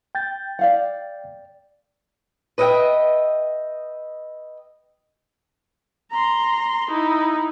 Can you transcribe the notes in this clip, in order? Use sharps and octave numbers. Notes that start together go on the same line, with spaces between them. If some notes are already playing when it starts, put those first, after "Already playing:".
G5 G6 A6
D5 F5 F#5
B4 D#5 E5 F#5 G5
A#5 C6
D#4 E4